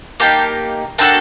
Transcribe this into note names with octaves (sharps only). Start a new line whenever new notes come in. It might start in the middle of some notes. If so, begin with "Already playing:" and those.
A#3 D#4 G4 G5 A5
A#3 D4 F#4 A4 G5 A5